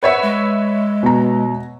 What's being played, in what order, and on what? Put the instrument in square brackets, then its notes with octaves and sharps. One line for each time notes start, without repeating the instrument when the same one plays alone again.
[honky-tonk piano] B4 C#5 E5 [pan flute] F#5
[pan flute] G#3
[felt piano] B2 A#5